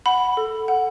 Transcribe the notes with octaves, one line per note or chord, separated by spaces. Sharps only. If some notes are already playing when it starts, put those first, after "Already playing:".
F#5 B5
A4
F#5